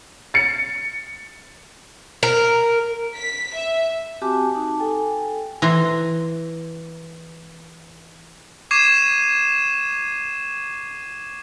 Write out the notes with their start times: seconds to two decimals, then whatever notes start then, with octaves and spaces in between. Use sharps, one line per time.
0.34 A6 C#7
2.23 A#4
3.16 B6
3.55 E5
4.22 C4 F#4 G4 G#5 A5 D6
4.55 D#4 A5
4.79 A4 G5 G#5
5.62 E3 A#5 C6
8.71 C#6 D6 G#6 C7 D#7 E7